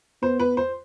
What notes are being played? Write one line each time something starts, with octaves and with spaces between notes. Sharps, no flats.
B3 C5
B4
C5